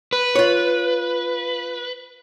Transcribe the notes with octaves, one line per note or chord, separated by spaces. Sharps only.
B4
F4 C#5